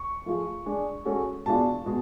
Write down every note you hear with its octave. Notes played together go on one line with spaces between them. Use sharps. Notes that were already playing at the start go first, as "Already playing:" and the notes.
Already playing: C#6
F3 A3 F4 G#4
G#3 D4 G#4
G#3 C#4 F#4 A4
B2 G#3 D4 F4 A5
B2 G#3 G#4